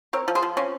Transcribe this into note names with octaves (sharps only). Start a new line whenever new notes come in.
C4 A#4 C#5
F3
G#4 C5
F3
C4 C#4